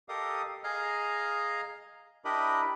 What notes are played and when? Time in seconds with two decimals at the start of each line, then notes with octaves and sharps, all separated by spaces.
0.09 G4 A4 A#4 D#5 F5 D#6
0.64 G#4 D#5 F5 G#5 A#5 F6
2.25 D4 E4 G4 A#4 D#5 B5